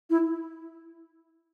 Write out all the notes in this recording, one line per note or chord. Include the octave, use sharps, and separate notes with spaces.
E4